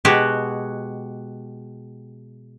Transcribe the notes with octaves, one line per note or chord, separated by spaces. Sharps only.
B2 G#3 F#4 G4